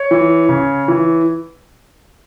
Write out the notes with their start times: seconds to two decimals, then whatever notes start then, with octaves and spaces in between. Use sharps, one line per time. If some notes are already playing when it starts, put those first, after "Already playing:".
Already playing: C#5
0.11 E3
0.49 C#3
0.88 E3